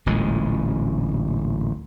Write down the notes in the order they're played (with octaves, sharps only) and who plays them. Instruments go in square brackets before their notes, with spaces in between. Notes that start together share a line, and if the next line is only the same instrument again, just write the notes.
[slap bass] D1 A1 A#2 G#3